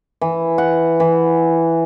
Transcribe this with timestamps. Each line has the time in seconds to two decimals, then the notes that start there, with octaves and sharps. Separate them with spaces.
0.21 E3
0.58 F#5
1.00 E3